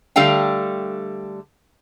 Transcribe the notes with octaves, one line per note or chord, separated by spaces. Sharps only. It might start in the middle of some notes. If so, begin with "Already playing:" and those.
D3 G3 A3 F5 G5